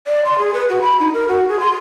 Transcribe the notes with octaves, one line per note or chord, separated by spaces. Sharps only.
D5
C6
G#4
B4
F#4
B5
D#4
A#4
F#4
G#4
C6